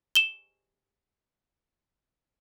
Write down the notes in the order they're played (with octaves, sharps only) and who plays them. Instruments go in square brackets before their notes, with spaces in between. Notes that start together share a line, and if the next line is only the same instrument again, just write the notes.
[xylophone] E7 G7